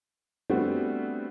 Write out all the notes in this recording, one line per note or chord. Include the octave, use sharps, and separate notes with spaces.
G3 A3 B3 C4 D4 F#4